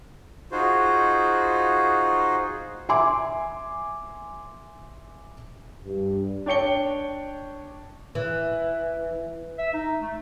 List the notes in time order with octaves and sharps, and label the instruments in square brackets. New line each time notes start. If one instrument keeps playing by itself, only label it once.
[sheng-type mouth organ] D#4 F4 F#4 G#4 C5
[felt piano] E5 G#5 C6 D6
[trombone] G2
[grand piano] D4 C#5 G5 C#7 G7
[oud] E3
[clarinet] E5
D#4
A3